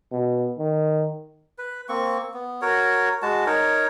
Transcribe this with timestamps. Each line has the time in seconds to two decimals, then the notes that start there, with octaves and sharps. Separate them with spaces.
0.12 B2
0.58 D#3
1.58 B4
1.89 A#3 C4 C#6
2.34 B3
2.62 F#4 A#4 C#5
3.22 G#3 F#4 A5
3.46 D#4 A#4 C#5